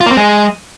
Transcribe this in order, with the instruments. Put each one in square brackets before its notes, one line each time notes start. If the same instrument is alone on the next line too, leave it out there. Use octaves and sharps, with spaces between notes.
[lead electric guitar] F4
A#3
C4
G#3